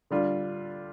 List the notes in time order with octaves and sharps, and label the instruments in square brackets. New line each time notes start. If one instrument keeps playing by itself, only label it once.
[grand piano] D3 G3 D4 F4